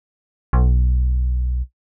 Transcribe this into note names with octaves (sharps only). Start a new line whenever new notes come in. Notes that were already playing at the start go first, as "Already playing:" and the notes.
B1